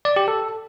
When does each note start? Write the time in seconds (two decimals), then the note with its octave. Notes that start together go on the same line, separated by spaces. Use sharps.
0.05 D5
0.16 G4
0.28 A4